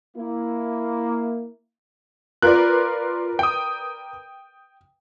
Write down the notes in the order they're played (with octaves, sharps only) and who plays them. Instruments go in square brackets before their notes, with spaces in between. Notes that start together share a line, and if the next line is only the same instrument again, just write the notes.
[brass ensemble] A#3 E4
[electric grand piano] F4 F#6 [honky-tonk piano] A#4 B4 D5
[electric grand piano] G5 D#6